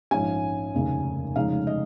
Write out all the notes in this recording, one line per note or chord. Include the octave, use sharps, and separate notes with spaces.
A#1 G#2 F3 C#4 G#5
F1 D#2 C#3
F1 F2 C#3 G#3 D#4 F5
D#5